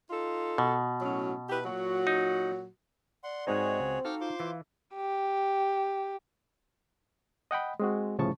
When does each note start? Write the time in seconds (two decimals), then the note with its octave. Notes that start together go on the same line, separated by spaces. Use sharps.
0.10 D#4 F4 A4
0.58 B2
1.01 A2 F#3 C#4
1.49 E4 G4 B4
1.64 A#2 F#3 F#4
2.07 D#4
3.24 D5 F#5 C6
3.47 G#2 G#3 C4 D#4 F#4 G#4 C#5
3.80 C#2
4.05 D#4 F#4 A4 F5 G5 D6 F6
4.21 F4 C5 C6 D6
4.40 E3 F5
4.95 G4
7.51 D#5 F#5 G5 B5
7.80 G#3 C4 F#4
8.19 C2 A2 C#3 F3 A5 C#6